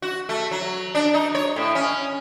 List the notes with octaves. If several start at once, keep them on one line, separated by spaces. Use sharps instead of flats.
F#4
A3
F#3
D4
D#4
C#5
A2
C#4